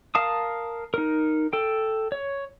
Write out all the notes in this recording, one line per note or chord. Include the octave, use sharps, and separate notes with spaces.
A#4 F5 A5 D#6
D#4 A#4
A4 G5
C#5